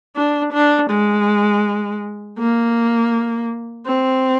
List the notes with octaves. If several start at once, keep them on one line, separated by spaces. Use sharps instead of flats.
D4
D4
G#3
A#3
C4